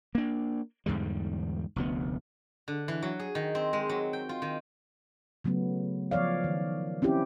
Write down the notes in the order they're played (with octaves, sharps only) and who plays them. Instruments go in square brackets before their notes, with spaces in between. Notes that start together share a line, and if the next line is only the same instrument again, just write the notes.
[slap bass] A#3 D4
E2 G#2 D3 G3
F1 D2 B3
[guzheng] D3
E3
F#3
G#4
D#3
C4
G#3
F#3
G5
F4
D#3
[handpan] C#3 F#3 A3 B3
F3 B3 C#5 D5 F5
D#3
C4 C#4 E4 G4